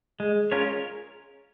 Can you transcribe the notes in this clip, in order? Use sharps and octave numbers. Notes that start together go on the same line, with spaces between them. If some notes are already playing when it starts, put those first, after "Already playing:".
G#3 G#4
C#4 F4 A#4 C#5